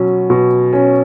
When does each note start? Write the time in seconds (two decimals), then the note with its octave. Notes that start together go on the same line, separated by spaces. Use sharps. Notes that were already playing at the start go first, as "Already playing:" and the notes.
Already playing: B2 F#3 C#4
0.30 B2
0.73 C#4